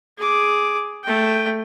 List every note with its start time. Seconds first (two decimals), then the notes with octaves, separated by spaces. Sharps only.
0.18 G#4 D6
1.04 A3 G5